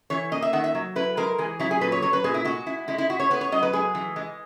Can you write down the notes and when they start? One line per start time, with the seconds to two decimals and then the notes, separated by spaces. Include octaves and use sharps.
0.10 E3 C#5
0.32 A#3 D#5
0.42 E5
0.53 D#3 F#5
0.64 E5
0.75 F#3
0.96 E4 B4
1.17 G#3 A#4
1.38 E3 G#4
1.60 F#3 E4
1.71 G#4
1.81 A#2 B4
1.92 C#5
2.02 F#3 C#5
2.13 B4
2.24 A#2 G#4
2.34 E4
2.45 G#3 F#4
2.67 E4
2.88 G#3 E4
2.98 E4
3.10 E4 F#4
3.20 C#5
3.30 B3 B4
3.41 C#5
3.52 F#3 D#5
3.63 B4
3.73 G#3 G#4
3.95 E3
4.16 G#3